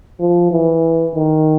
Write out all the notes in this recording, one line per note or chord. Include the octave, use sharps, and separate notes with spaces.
F3
E3
D#3